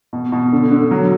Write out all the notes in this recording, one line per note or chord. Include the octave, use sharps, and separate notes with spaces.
B2
B2
D3
D3
F#3